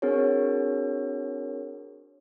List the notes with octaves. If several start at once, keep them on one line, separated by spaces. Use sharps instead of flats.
C4 D4 F#4 G#4 A#4 C#5